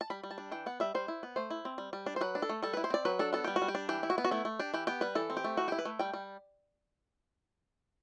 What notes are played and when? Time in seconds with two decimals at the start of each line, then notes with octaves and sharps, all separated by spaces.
0.01 A5
0.10 G3 B5
0.23 G3
0.31 A5
0.38 D4
0.52 E3 G5
0.66 B3 F#5
0.80 G3 E5
0.95 G3 C5
1.08 E4
1.23 B3
1.36 A3 C5
1.50 E4
1.65 C4
1.78 G3
1.93 G3
2.06 D4
2.16 C5
2.21 F#3 B4
2.35 D4
2.42 A4
2.49 A3
2.63 G3 A4
2.73 E4 B4
2.84 C5
2.90 C4 D5
3.05 F#3 B4
3.19 D4 A4
3.33 B3 A4
3.44 G3 G4
3.56 F#4
3.62 G3
3.68 G4
3.75 D4
3.89 E3 G4
4.03 E4
4.10 F#4
4.18 B3
4.25 F#4
4.31 A3 E4
4.45 A3
4.59 D4 G4
4.74 E3 G4
4.87 B3 G4
5.01 G3 B4
5.15 E3 A4
5.30 C4
5.37 G4
5.44 A3
5.57 E3 F#4
5.68 E4 G4
5.79 B4
5.85 A3
5.99 G3 G5
6.13 G3